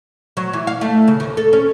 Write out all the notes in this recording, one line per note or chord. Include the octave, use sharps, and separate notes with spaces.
F#3
E3
F5
A3
C#3
D#2
A4
C#4